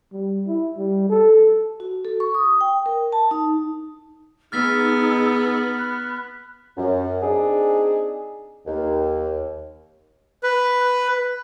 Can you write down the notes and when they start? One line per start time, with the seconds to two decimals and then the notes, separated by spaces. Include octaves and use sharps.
0.12 G3
0.47 E4
0.77 G3
1.10 A4
1.80 F#4
2.05 A4
2.20 C#6
2.34 D#6
2.61 G5
2.86 A#4
3.12 A5
3.31 D#4
4.52 B3 D#4 G#4 E6 F6 A6 B6
5.78 B5 F#6
6.77 F#2
7.22 C4 D4 D#4 G#4
8.67 D#2
10.43 B4